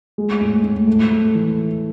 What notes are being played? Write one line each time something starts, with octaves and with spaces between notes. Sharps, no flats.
G#3
A2
A2
A3
A3
E3